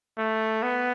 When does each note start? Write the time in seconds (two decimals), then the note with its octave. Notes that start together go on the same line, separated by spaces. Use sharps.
0.18 A3
0.62 B3